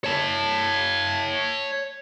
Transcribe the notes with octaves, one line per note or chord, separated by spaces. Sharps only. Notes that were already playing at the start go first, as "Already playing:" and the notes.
C#5 A5